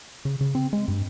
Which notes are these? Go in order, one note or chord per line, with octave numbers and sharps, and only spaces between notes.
C#3
C#3
C4
G#3
G2